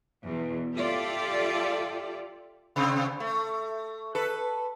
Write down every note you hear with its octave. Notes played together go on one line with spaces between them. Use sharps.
E2 B2
F4 G4 A4 D5 E5
C3 C4
A3
A4 B4